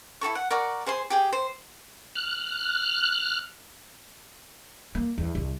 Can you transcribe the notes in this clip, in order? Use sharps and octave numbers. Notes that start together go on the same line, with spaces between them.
E4 G#4 A4 C#6
F#5
A#4 D5 F#5 C#6
G#4 C5 G#5 C6
G4 G#4 G5
C5
F6 F#6
A#3
E2
C2